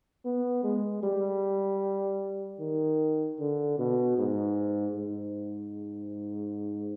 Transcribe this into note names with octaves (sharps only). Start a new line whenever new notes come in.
B3
G#3
G3
D#3
D3
B2
G#2
G#2